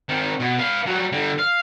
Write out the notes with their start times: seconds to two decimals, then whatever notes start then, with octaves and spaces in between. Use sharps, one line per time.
0.09 D#3 C4
0.40 B2
0.59 B4 F5
0.87 F#3 G3
1.12 D3 G3
1.39 F5